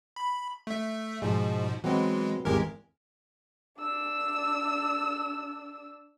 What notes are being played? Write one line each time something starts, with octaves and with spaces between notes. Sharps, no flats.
B5
A3 E5
G#2 B2 F3 G#3 D#4
E3 F#3 G#3 B3 C4
G#1 E2 G#3 G4 A#4 G#5
D4 E6